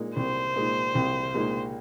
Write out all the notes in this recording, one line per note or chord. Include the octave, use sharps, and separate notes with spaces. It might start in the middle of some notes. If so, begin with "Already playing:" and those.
Already playing: A#2 G#3 D#4
C2 C5
A#2 G#3 D#4
C2
A#2 G#3 D#4